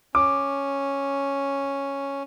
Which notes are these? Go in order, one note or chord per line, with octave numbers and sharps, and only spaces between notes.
C#4 D6